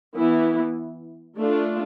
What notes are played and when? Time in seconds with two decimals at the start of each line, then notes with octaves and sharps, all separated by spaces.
0.14 E3 B3 E4
1.37 A3 D4 F4